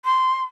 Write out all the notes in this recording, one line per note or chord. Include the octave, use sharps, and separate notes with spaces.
C6